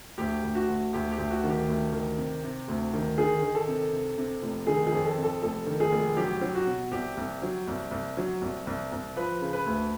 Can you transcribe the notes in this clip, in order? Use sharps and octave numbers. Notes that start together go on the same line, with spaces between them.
D2 G4
D2
F#4
D2
D2 G4
G4
D2
F#4
D#3
G4
D2
D#3
C3
C3
D2
D#3
D#3 G#4
D#3
A4
C3
C3
C3
F1
D#3 G#4
G#4
F2
A4
C3
A4
F1 A4
D#3
G#4
F1
F#3 G4
F#3
F#4
B2
C2 G4
C2
F#3
C2
C2
F#3
C2
C2
C2
F3 B4
C#3
B4
D2